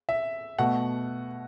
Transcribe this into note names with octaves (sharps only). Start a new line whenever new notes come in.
E5
B2 A3 F#5